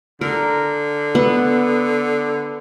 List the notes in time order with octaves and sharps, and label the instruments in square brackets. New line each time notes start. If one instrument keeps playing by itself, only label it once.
[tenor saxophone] D3 [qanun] A#4
[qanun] B3